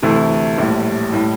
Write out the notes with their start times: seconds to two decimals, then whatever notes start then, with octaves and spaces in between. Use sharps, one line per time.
0.02 D2 C3 E3 A3 E4
0.58 A#1 A2 G3
1.12 A2 G3